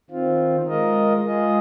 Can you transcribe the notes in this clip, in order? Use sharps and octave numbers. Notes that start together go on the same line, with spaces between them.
D#3 C4 F4
G#3 F4 A#4 D#5
G#3 F4 G#4 D#5